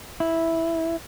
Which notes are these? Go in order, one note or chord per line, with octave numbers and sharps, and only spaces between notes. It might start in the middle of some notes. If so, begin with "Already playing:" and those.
E4